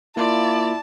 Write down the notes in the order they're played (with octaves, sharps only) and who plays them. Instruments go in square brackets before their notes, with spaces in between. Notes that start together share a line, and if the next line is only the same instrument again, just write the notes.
[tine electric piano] A#3 F4 [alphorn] E4 [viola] D5 [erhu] A5